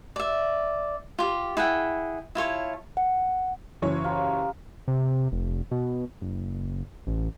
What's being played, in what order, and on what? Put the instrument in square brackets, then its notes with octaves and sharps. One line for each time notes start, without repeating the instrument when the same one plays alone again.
[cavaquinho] D5 E5
F4 G4
E4 G#4 F#5 G5
E4 F4 C#5 A5
[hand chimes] F#5
[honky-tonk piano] F#1 E3 C#5
[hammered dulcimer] F4 G4 A#5
[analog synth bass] C3
F1
B2
F#1
A1